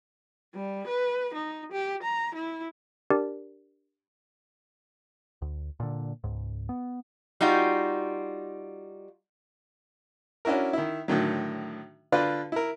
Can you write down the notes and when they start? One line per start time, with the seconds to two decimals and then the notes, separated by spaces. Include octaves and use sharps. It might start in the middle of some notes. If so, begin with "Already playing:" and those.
0.55 G3
0.87 B4
1.34 D#4
1.72 G4
2.03 A#5
2.35 E4
3.10 D4 G4 A#4 D5
5.42 D2
5.80 A#2 D3
6.24 C#2 G#2
6.69 B3
7.41 G3 D#4 F4 F#4
10.45 C#4 D4 E4 F#4 A#4
10.73 D#3 E4
11.08 A2 D3 D#3 F#3
12.12 D3 F4 B4 D5 C6
12.52 E4 A#4